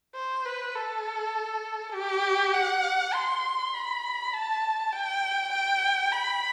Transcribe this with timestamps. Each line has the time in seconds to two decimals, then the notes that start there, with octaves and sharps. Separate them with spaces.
0.15 C5
0.46 B4
0.75 A4
1.94 G4
2.54 F#5
3.14 C6
3.74 B5
4.34 A5
4.92 G5
5.53 G5
6.12 B5